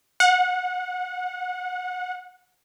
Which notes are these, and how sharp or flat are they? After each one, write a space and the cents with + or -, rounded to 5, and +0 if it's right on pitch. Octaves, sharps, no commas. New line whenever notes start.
F#5 -25